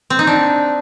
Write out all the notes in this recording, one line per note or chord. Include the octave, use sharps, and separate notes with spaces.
C4
D#4
D4